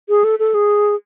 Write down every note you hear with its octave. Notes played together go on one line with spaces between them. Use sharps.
G#4
A4
A4
G#4